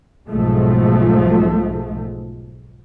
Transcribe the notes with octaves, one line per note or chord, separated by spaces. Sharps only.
B1 G#2 F3 G#3 A3